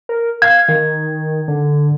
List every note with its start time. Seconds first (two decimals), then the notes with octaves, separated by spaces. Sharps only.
0.09 A#4
0.42 F5 G#6
0.68 D#3
1.48 D3